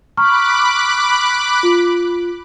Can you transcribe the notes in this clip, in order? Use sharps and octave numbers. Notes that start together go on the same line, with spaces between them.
A#5 B5 C#6 D6 F6 F#6
F4